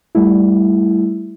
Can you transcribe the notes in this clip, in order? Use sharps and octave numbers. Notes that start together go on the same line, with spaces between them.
G3 A3 E4